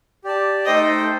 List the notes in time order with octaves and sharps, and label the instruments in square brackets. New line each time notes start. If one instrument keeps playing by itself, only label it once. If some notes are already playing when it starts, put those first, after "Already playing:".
[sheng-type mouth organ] G4 D5 A5
[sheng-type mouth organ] A3 D#4 A4 C5 G5 [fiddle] D#5